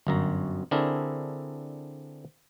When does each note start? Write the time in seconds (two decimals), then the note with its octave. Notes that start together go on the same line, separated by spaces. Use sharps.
0.07 G1 F#2 A#5
0.71 D3 C4 D4 E4 G#4 A#4